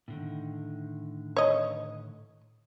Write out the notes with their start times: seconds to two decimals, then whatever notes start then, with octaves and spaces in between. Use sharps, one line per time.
0.08 A2 D3 D#3
1.36 C#5 D#5